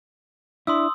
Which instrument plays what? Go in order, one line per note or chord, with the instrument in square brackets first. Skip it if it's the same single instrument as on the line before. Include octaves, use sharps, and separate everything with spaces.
[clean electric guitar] D4 E4 [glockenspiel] C6 D#6 E6